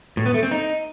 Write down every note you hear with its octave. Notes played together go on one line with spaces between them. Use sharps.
A2
B3
A3
C4
D#4